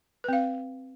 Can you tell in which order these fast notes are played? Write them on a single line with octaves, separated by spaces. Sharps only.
B4 C4 F5